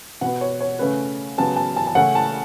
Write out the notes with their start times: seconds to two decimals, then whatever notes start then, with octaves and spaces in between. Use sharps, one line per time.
0.21 B2 B3 F#5
0.41 C#5
0.61 C#5
0.79 C#3 A3 C#4 B4
1.38 C#3 F#3 B3 A5
1.56 A5
1.76 A5
1.87 A5
1.95 C#3 A3 C#4 F#5
2.15 A5